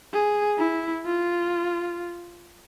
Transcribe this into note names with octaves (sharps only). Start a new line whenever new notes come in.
G#4
E4
F4